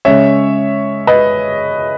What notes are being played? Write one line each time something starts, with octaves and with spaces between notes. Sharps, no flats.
C#3 G#3 C#4 C#5 E5
B4 D#5